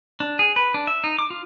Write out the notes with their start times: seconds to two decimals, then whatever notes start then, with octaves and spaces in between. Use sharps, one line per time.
0.20 D4
0.39 G#4
0.56 B4
0.74 D4
0.87 E5
1.04 D#4
1.19 D6
1.30 F4